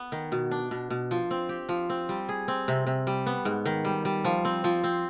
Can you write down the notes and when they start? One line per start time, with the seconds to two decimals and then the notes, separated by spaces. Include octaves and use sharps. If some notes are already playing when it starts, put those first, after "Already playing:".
Already playing: B3
0.12 D#3
0.32 B2
0.51 D4
0.71 B2
0.90 B2
1.11 F3
1.31 C4
1.49 G4
1.69 F3
1.90 C4
2.09 G3
2.29 G#4
2.48 C4
2.68 C3
2.87 C3
3.07 G3
3.26 B3
3.45 G#2
3.66 D#3
3.85 G3
4.05 G3
4.25 F3
4.45 C4
4.64 F3
4.84 C4